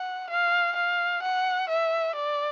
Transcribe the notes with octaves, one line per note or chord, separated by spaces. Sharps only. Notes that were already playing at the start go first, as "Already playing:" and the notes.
Already playing: F#5
F5
F5
F#5
E5
D5